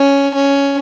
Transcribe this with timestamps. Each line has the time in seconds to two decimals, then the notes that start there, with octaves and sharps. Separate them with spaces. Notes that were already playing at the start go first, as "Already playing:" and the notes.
Already playing: C#4
0.35 C#4